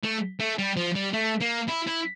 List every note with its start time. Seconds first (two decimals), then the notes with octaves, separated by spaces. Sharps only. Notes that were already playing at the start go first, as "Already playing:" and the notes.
0.03 A3
0.40 A3
0.59 G3
0.77 F3
0.96 G3
1.13 A3
1.41 A#3
1.69 E4
1.87 E4